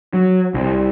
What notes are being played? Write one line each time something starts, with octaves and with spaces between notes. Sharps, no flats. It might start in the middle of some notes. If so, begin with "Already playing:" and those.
F#3
C2